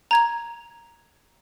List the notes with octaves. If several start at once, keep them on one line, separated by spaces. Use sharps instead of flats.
A#5 G#6 F7